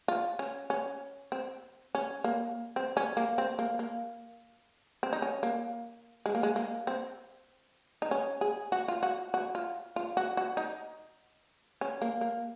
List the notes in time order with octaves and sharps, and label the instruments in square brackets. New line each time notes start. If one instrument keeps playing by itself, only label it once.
[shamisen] F4
C#4
C#4
C4
C#4
A#3
C4
C#4
A#3
C4
A#3
A#3
C4
D#4
C#4
A#3
G#3
A#3
G#3
A#3
C4
D#4
C#4
G#4
F#4
F4
F#4
F#4
F4
F4
F#4
F#4
D#4
C#4
A#3
A#3